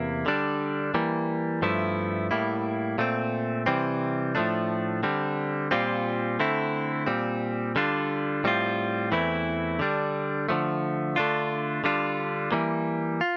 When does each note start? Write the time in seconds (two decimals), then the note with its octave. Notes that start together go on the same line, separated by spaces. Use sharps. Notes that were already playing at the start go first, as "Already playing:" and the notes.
Already playing: E2 C3 A#3 E4
0.26 D3 G3 D4
0.94 E3 G3 A#3
1.62 G2 F3 A3 E4
2.31 A2 G3 A#3 E4
2.98 A#2 A3 C4
3.66 C3 E3 G3 C4
4.35 A2 F3 A3 D4
5.03 D3 G3 C4
5.71 A#2 G3 C4 F4
6.40 D3 A3 C4 E4
7.06 A#2 G3 C4
7.76 D3 G3 D4 F4
8.44 A2 G3 C4 F4
9.12 E2 E3 A3 C4 E4
9.79 D3 G3 D4
10.49 D3 F3 A3
11.16 D3 A3 D4 F4
11.84 D3 G3 D4 F4
12.52 E3 G3 A#3
13.21 F4